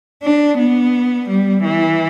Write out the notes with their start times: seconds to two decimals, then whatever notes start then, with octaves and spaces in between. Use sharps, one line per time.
0.23 D4
0.59 B3
1.29 G3
1.64 E3